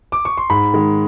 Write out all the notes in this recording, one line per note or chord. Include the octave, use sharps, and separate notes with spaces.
D6
C#6
C6
G#2 B5
D#3 G#3